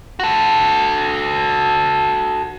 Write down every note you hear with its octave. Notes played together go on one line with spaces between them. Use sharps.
F#4 A4